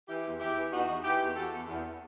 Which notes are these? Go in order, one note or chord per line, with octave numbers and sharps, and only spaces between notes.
E3 E4 G4
E2
E2 E4 G4
E3
E2 D#4 F#4
E2
E3 E4 G4
E2
E2 F#4 A4
E2
E2